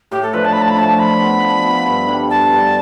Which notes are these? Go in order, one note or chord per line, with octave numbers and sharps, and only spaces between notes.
A2 G4
A4
F3 A3 D4 B4
A5
A2 B5
A5
B5
F3 A3 D4 A5
F3 B5
B3 F4 A4
F3
B3 F4 A4
G2
D3 G3
G2 A5
D3 G3